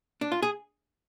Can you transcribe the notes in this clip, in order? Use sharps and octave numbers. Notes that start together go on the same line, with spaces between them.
D4
F4
G#4